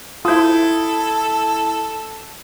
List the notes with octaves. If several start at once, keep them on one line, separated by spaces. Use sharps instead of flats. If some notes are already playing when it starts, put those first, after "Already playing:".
E4 F4 A4 C5 D#6